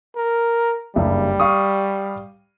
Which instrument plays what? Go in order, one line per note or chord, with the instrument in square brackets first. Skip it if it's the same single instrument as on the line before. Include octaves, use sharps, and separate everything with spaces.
[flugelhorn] A#4
[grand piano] F#1 G2 [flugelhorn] G3
[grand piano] F5 C#6 D#6